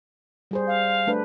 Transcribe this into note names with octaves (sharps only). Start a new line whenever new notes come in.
G3 G#4 C5
F5
A3 D4 B4